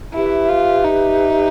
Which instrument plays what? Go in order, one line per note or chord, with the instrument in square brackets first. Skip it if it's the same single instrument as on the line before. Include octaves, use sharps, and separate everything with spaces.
[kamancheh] E4 [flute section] G4 B4 E5
[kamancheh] F4
D#4